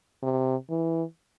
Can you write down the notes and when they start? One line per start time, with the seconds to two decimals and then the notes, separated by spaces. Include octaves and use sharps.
0.23 C3
0.70 E3